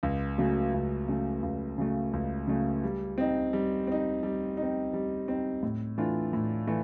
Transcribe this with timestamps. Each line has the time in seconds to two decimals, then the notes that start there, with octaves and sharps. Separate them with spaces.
0.03 C#2
0.38 C#3 F#3 A3
0.74 C#2
1.08 C#3 F#3 A3
1.43 C#2
1.78 C#3 F#3 A3
2.13 C#2
2.47 C#3 F#3 A3
2.84 G3
3.18 C4 D#4
3.53 G3
3.87 C4 D#4
4.23 G3
4.57 D#4
4.62 C4
4.93 G3
5.28 C4 D#4
5.63 A2
5.98 E3 A3 D4 F4
6.33 A2
6.67 E3 A3